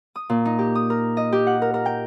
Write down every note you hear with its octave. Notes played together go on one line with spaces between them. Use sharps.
D#6
A#2
D#4
G4
D#6
A#4
D#5
G4
F#5
A#4
A#4
G5